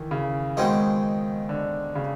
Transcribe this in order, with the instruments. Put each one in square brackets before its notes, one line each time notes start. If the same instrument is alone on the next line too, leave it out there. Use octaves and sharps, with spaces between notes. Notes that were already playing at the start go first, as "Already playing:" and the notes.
Already playing: [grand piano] D#3 E3
C#3
[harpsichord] B2 G#3 C4 D#4 [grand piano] D#3
[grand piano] D3
C#3